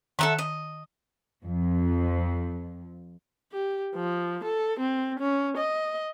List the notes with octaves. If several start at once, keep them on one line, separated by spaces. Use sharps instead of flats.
D#3 A4 E5 F#5 A#5
D#5
F2 F3
G4
F3
A4
C4
C#4
D#5